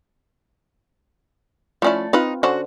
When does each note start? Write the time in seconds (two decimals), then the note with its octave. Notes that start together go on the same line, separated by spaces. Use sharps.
1.82 F3 A3 C#4 E4 D5
2.13 C4 D#4 F4 B4
2.43 D3 C#4 F#4 C5